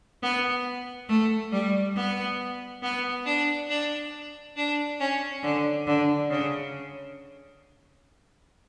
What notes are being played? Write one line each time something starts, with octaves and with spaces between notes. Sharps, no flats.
B3
A3
G3
B3
B3
D4
D4
D4
C#4
D3
D3
C#3